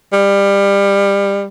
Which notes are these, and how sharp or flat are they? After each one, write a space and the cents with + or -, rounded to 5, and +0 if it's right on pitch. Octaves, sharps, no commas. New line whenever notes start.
G3 +25